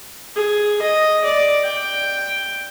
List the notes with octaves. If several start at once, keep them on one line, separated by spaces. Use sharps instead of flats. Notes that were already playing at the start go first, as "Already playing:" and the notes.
G#4
D#5
D5
G5